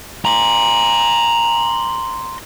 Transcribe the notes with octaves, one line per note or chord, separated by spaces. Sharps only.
A#5 C6